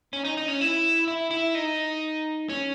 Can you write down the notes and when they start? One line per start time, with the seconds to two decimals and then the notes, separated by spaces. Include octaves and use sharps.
0.13 C#4
0.25 D#4
0.37 D#4
0.48 C#4
0.61 E4
1.08 E4
1.31 E4
1.55 D#4
2.49 C#4